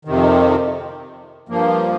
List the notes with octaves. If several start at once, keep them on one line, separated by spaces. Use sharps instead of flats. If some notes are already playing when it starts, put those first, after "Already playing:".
F2 C3 D#3
G2 F3 A#3